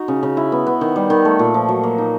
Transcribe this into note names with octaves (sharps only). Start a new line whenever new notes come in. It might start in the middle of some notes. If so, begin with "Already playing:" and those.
Already playing: D#4 F#4
C#3
C#3
E4
B3
B3
D#3
G3
D#3
A3
A#2
F3
F#3
A#3
D#4